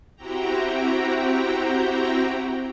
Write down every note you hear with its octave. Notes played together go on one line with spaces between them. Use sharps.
C4 E4 F#4 G4 G5 A#5